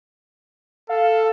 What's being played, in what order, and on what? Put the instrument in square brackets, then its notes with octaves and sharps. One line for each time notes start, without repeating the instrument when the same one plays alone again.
[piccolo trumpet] A4 [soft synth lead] F5